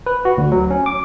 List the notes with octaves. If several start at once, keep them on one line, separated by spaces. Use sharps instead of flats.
B4
F#4
D2
F#3
C#4
D6